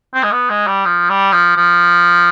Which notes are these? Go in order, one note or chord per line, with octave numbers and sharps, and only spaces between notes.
C4
G#3
B3
G#3
G3
F3
G3
F3
F3